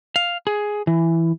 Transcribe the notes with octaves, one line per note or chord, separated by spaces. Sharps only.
F5
G#4
E3